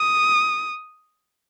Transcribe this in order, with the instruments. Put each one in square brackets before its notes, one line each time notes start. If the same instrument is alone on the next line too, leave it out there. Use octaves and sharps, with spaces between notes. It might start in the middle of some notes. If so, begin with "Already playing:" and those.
Already playing: [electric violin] D#6